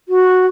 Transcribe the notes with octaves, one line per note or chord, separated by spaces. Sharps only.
F#4